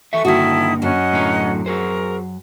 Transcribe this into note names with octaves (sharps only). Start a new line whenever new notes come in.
E3 A4 E5 C#6
G2 D3 D#3 A#3 E4 F#4 A4 D#6
F#2 F#3 C#4 D#5 F#5
A2 D3 A#5
F#4 G#4 A#4 C5